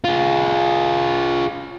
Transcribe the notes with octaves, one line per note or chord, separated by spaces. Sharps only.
F4 G#4